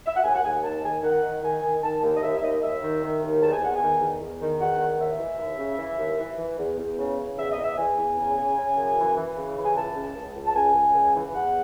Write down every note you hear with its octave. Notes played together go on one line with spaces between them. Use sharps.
E5
F#5
D#2 G#5
F#5
D#2 G#5
D#3 A5
D#3 G#5
D#3 F#5
D#3
D#3 G#5
D#3
D#3 A5
D#2
D#5
D#2 E5
E5
D#2 D#5
D#2 E5
D#3
D#3
D#2
E2 A5
G#5
E2 F#5
G#5
D#3
E2
E2
D#3
E2 F#5
D#3
D#2 E5
E3
D#2
C#3
E3
D#2
E3
E3
E2
E2
C#3
C#3
E2 E5
D#5
E2
E5
E2 G#5
E2
C#3
C#3
C#3
F#2
E3
E3
C#3
E3
G#5
C#2 A5
C#2
C#2
C#2
A5
C#2 G#5
C#2
C#2
E3
E2 F#5